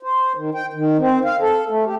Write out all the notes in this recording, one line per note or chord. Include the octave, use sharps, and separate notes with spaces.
C5
D#3
G5
D#3
C4
F5
A4
A3
G4